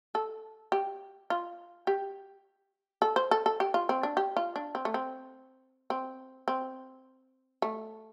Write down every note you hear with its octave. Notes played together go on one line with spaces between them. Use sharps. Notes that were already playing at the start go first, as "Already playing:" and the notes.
A4
G4
F4
G4
A4
C5
A4
A4
G4
F4
C4
D4
G4
F4
D4
C4
A3
C4
C4
C4
A3